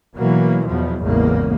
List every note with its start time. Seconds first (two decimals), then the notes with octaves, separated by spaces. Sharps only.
0.16 B2 E3 F#3 A#3
0.67 E2 B2 F3 F#3
1.02 A1 E2 G#2 C#3 A#3